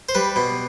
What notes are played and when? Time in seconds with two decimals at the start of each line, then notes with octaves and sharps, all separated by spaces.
0.09 C5
0.15 G3 B4
0.36 B2